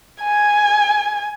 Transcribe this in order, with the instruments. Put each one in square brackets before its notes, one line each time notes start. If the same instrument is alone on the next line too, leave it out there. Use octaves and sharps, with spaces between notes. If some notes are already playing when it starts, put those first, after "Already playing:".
[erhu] G#5